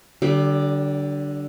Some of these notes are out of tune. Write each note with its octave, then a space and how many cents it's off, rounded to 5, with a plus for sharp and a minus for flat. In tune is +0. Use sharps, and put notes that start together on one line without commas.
D3 +0 G3 -40 G4 +10